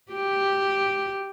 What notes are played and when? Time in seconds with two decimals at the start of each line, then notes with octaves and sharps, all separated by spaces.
0.13 G4